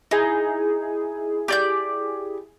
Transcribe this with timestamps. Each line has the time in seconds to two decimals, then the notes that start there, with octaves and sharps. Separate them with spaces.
0.11 D#4 E4 G#4
1.48 G4 D5 G6